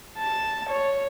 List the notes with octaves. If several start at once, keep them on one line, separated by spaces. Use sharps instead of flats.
A5
C#5